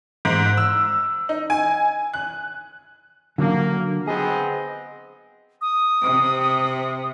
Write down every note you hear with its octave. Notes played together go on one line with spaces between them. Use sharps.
G#2
E6
D#4
G#5
F#6
D3 F#3 A#3 C#4
B3 C4 G#4 D#5
D#6
C3